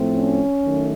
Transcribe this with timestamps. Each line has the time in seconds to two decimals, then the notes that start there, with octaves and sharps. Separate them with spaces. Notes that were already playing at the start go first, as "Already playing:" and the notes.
Already playing: A2 F3 A3 C4
0.15 C#4
0.63 D#3 F#3 A3